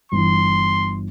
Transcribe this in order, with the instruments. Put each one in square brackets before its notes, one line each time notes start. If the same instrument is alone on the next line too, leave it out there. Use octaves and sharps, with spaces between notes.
[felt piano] G1 E3 [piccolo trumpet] C6